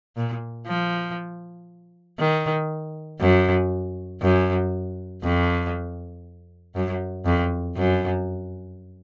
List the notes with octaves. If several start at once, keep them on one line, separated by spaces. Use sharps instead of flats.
A#2
F3
D#3
F#2
F#2
F2
F#2
F2
F#2